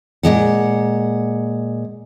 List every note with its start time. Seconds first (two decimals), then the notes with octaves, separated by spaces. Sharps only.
0.23 A#2 D#3 G#3 F#5